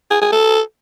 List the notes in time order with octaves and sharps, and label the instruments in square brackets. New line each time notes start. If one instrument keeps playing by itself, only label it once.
[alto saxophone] G#4
G#4
A4